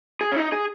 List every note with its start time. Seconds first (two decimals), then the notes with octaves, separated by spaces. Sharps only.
0.21 G#4
0.32 C#4
0.36 D#4
0.52 G#4